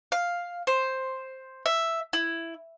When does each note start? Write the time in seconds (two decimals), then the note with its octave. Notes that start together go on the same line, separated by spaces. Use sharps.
0.12 F5
0.67 C5
1.66 E5
2.13 E4